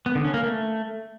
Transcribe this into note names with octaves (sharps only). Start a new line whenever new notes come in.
B3
D3
C#4
A#3
A3